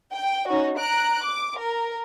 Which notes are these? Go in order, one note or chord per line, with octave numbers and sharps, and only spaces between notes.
G5
C#4 D#4 F#4
A#5 F#6 D7
D6
A#4